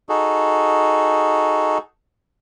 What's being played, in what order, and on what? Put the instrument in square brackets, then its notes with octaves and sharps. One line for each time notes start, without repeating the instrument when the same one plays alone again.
[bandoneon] D#4 F#4 G#4 A4